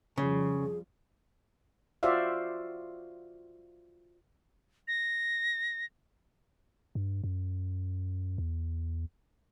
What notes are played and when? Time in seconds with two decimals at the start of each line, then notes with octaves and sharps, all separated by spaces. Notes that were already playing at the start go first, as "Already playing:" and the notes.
0.18 F2 C#3 F3 G3 G#4
2.03 F4 F#4 C5 D5 E5 F5
4.88 A#6
6.95 G2
7.24 F#2
8.38 E2